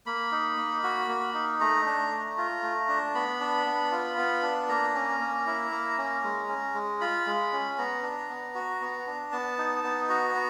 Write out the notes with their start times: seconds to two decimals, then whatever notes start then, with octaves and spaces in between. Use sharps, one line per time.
0.06 A#3 B5
0.32 D#4
0.57 A#3
0.84 F#4
1.09 A#3
1.34 D#4
1.61 A3 A#5
1.86 D4
2.12 A3
2.37 F4
2.63 A3
2.88 D4
3.15 B3 B5
3.41 D4
3.66 B3
3.92 F4
4.18 B3
4.43 D4
4.69 A#3 A#5
4.95 C#4
5.20 A#3
5.46 E4
5.71 A#3
5.98 C#4
6.24 G#3
6.48 C#4
6.75 G#3
7.01 F4 B5
7.27 G#3
7.53 C#4
7.78 B3 A#5
8.03 D4
8.29 B3
8.55 F#4
8.81 B3
9.07 D4
9.32 B3 A5
9.58 D#4
9.84 B3
10.09 F#4 A#5
10.35 B3